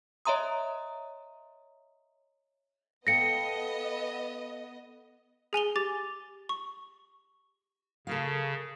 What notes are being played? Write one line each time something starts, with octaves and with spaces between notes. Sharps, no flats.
C#5 D#5 E5 A#5 C6 D#6
B3 A4 D#5 F5 G5 A#6 C#7
G#4 G#5 F7 G7
G4 D6 A6
C#6
C#3 A4 A#4 F5